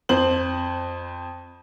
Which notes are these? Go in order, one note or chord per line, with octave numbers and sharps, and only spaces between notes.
F2 C5 F#7